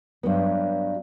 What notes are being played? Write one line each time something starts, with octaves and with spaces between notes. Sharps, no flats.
G2 F#3 B3